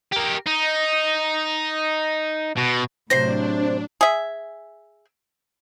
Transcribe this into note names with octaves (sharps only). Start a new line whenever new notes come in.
G4 A#4
D#4
B2
A2 C3 F#3 D4 C5 A#6 C7
G#4 E5